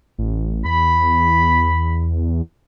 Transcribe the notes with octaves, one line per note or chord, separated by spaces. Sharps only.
A1
E2 B5